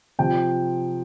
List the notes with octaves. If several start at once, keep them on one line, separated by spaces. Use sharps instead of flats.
C3 F3 G5